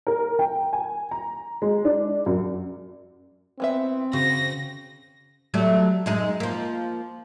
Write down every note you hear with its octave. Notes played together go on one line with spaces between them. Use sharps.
A#4
G5
G#5
A#5
G#3
D4
F#2
E3 B3 C4 E5
C#3 F#4 A#6
F#3 G3 A3
F#2 G#3 D#4
F3 A#3